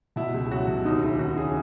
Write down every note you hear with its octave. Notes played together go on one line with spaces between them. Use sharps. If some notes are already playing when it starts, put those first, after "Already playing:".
B2 E4
C#2
F#3 F#4
B2
D#2 D#4
C#3 E4
D#2 F#4
C#3 G#4